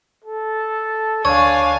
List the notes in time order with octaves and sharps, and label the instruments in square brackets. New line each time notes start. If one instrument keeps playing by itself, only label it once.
[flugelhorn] A4
[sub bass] D2 [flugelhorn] D4 [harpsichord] C#5 [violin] F5 G#5